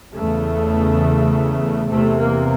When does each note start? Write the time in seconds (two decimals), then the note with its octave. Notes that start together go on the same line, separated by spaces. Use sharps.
0.14 E2 C#3 A3
1.90 E2 C3 A3
2.19 A#3